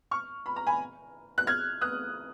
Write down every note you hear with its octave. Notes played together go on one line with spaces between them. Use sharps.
C#6 F6
B5
A#5
G#5 B5
F#6
F6 G#6
D#6 F#6